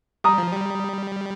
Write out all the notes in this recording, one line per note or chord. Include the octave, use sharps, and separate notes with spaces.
G3 A#5 D#6
F3
G3